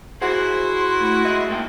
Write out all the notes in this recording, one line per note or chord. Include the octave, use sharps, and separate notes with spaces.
E4 F#4 G#4 C5 F#5 C6
A2
G#3 D#5 E5
G#2 A#3 G5